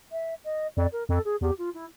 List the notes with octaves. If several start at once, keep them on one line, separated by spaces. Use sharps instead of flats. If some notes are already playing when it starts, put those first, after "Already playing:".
E5
D#5
F2 D5
A#4
F2 A4
G#4
E2 G4
F4
E4